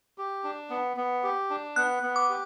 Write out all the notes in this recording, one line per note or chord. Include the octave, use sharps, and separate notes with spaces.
G4
D4
B3
B3
G4
D4
B3 F#6
B3
D6
G4